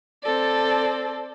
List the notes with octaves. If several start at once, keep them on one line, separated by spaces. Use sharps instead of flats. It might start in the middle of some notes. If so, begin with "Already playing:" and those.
C4 A4 D5